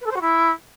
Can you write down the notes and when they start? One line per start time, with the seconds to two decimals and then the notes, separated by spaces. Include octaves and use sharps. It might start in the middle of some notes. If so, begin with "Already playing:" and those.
0.01 B4
0.06 A4
0.11 C5
0.16 F#4
0.21 E4